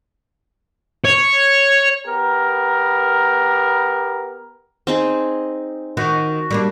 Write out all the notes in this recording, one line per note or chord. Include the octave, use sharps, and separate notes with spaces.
C#5
B3 G4 A#4
C4 D#4 G#4
D#3 F#4
G3 A#3 D4